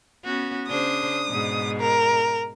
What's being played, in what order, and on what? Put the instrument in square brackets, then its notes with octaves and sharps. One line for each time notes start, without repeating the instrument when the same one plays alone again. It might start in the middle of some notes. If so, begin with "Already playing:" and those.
[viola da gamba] B3 C#4 F#4
[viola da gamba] C#3 D4 C5 [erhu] D#6
[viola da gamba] G#2 B2
[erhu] A#4